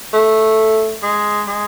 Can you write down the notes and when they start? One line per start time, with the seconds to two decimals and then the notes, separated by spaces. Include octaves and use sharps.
0.14 A3
1.03 G#3
1.48 G#3